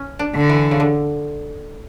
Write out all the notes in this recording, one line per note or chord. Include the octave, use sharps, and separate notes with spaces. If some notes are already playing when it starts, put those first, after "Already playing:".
Already playing: C#4
D4
D3
E3
C#3
D3